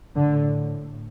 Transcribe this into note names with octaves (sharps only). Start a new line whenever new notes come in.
A2 D3